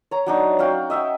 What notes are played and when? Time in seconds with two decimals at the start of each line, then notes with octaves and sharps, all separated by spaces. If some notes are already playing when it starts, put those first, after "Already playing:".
0.11 C#5 A#5
0.26 F#3 D4 D#4
0.59 C#4 F#4 F5 G5
0.90 D#5 E5 F#5 G5